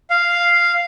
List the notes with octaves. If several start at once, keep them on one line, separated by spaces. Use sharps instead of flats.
F5